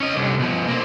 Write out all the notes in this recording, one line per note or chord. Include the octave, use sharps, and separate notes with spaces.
C#4 D#5
C2 D3
B2 F3
A#3 C4